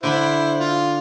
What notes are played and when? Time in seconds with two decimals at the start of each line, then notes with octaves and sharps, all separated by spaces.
0.03 D3 D4 E4 C5 B5
0.59 F4